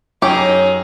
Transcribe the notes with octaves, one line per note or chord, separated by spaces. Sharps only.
F#2 D#4 G4 G#4 C#5